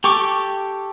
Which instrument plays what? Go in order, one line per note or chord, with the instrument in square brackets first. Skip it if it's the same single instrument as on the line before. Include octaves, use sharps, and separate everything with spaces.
[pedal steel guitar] G4 A4 C#6 D6